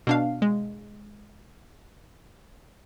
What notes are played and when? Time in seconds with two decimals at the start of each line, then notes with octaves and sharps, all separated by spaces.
0.07 B2 D4 F5
0.42 G#3